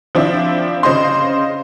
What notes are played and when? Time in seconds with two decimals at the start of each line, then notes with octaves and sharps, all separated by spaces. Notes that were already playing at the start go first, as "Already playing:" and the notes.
0.15 F3 C4 D4 E4
0.83 C#3 C5 D#5 C6